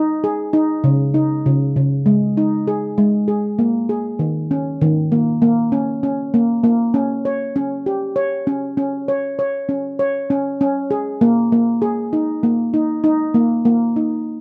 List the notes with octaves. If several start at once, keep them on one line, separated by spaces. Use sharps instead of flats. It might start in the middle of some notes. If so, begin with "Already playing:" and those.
Already playing: D#4
G#4
D#4
C#3
D#4
C#3
C#3
G#3
D#4
G#4
G#3
G#4
A#3
G#4
D#3
C#4
D#3
A#3
A#3
C#4
C#4
A#3
A#3
C#4
C#5
C#4
G4
C#5
C#4
C#4
C#5
C#5
C#4
C#5
C#4
C#4
G#4
A#3
A#3
G#4
D#4
A#3
D#4
D#4
A#3
A#3
D#4